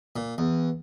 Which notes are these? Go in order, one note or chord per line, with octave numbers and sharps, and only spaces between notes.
A#2
E2